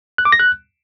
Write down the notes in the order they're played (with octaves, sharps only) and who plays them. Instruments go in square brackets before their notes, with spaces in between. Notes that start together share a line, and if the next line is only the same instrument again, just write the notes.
[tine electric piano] F#6
D6
A#6
F#6